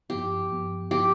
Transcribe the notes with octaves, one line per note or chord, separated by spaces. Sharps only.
G2 F3 B3 G4
G2 F3 B3
F3 B3 G4